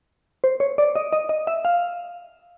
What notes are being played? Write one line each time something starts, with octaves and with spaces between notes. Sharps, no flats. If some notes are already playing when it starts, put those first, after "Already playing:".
C5
C#5
D5
D#5
D#5
D#5
E5
F5